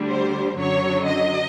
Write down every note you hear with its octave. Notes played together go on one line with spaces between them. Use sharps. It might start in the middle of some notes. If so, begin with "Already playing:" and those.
Already playing: D2 D3 G3
C5
F#2 D3 F#3 C#5
D#5